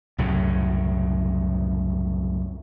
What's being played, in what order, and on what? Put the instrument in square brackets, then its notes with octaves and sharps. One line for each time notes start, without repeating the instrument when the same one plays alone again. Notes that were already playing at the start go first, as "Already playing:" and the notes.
[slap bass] C2 F#2 A2 C#3